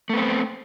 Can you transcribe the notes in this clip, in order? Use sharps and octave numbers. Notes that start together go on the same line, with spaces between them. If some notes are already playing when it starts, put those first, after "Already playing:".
A3 B3 C4